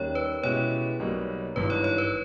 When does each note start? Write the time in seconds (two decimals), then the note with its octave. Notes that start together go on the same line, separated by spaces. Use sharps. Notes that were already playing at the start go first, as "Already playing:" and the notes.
Already playing: D#2 D#3 G3 C#4 C#5
0.15 B4
0.43 B2 G#3 C#4 E4 G4 C#5
0.99 B1 B2 G3 A#3
1.56 G#1 G2 E3 B4
1.70 C#5
1.84 C#5
1.98 B4